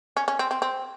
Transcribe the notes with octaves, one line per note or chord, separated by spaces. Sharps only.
C#4
C#4
C4
C4
C4